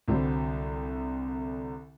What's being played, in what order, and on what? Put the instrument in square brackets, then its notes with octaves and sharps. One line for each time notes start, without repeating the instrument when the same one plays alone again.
[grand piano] C2 D3 F#3 G3 C5